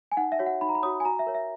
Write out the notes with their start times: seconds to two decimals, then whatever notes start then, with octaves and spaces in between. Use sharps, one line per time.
0.12 G#5
0.17 D#4 F#5
0.32 E5
0.39 F#4 C#5
0.46 F#5
0.61 D#4 B5
0.69 A#5
0.75 B5
0.83 F#4 C#5 D#6
1.00 G#5
1.05 F#4 A#5
1.19 E5
1.26 A#4 C#5
1.35 E5